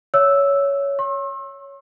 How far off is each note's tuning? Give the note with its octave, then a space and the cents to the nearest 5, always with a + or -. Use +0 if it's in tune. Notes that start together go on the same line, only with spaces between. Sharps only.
C#5 +10 E5 +0 E6 +0
C#5 +0 C6 +45